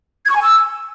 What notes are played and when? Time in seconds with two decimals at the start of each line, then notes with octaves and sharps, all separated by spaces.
0.25 G#6
0.31 C#6
0.36 G#5
0.41 E6